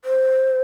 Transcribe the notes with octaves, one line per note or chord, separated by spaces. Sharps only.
C5